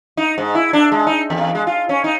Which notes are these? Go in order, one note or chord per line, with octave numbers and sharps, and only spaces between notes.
D#4
G#2
E4
D4
G#3
D#4
E2
G#3
F4
C#4
D#4